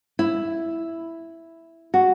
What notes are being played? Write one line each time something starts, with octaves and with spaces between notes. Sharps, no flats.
E4
F#4